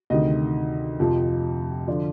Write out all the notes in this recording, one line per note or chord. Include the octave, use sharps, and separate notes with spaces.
D2 C3 D#3 D#5
F2 C3 F3
D3 F3 D5